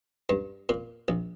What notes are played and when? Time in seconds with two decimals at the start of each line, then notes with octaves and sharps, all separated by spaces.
0.29 G2
0.69 A#2
1.08 A#1